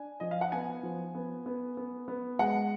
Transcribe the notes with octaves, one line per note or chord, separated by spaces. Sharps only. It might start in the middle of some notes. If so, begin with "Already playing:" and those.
Already playing: D4 G#5
F3 D#5
F5
F#5
B3 G#5
F3
B3
B3
B3
B3
G#3 F#5